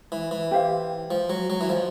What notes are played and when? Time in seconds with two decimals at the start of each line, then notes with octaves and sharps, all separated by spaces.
0.12 E3
0.31 E3
0.51 E4 G4 C5 F5
1.11 F3
1.30 F#3
1.50 F#3
1.61 E3
1.69 F3 B4 D#5 G#5